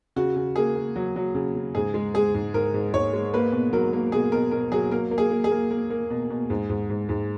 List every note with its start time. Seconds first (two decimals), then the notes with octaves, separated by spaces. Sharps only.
0.16 C#3 F#4
0.36 C#3
0.56 A#3 G#4
0.75 A#3
0.96 F#3
1.16 F#3
1.35 C#3
1.55 C#3
1.75 G#2 G#4
1.94 G#3
2.14 G#3 G#4
2.35 G#2
2.54 G#2 A#4
2.74 G#2
2.93 G#2 C#5
3.13 G#3
3.33 A#3 B4
3.52 B2
3.73 F#3 A#4
3.93 A#3
4.12 B2 G#4
4.32 B2 A#4
4.51 B2 A#4
4.72 F#3 G#4
4.91 A#3 A#4
5.11 A#3
5.18 G#4
5.31 A#3
5.44 G#4
5.52 A#3
5.71 A#3
5.90 A#3
6.10 B2
6.30 B2
6.50 G#2
6.69 G#2
6.90 G#2
7.09 G#2